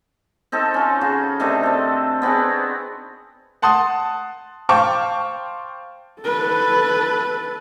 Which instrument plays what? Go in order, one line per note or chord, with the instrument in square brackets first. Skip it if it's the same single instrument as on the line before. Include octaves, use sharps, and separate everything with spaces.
[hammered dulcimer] C4 D#4 A4 A5
C#4 F4
C#3 F#4 F5 C#6
C3 D#3 A3 D4
C4 A4
B3 C4 F#4 G#4
[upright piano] F#5 A5 C6 D#6
C5 F5 G5 A5 C#6 D6
[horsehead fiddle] A4 B4